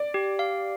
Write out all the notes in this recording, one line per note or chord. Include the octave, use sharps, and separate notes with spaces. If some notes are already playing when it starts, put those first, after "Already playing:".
Already playing: D5
G4
F5